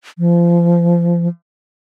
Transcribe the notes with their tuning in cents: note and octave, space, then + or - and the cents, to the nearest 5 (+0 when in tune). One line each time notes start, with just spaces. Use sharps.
F3 -30